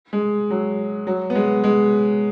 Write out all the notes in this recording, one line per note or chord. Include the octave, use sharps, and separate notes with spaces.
G#3
F#3
F#3
B3
G#3
G#3